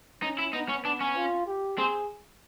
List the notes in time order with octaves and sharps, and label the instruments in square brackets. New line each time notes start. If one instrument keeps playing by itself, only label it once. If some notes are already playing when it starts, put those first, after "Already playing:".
[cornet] C#4 [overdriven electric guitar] D#4
[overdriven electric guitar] E4
[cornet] B3 [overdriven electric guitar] D#4
[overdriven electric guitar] C#4
[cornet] B3 [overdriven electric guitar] D4
[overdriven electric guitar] C#4
[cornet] F4
G4
[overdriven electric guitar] C4 [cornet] G#4